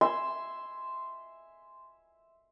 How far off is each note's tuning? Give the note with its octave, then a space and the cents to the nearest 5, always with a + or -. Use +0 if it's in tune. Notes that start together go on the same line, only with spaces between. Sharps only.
E5 +0 G#5 +0 C6 -5